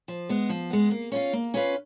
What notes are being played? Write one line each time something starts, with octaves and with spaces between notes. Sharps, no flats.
F3
G#3 B3
F3
G#3 B3
A#3
C#4 F4 B4 F5
A#3
C#4 F4 B4 F5